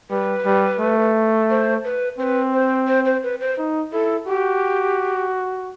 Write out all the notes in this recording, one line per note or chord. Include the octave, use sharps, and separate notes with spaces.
G3 B4
G3
A3
C5
B4
C4 B4 C5
C5
C5
C5
B4
C5
D#4
E4 A4
F#4 G4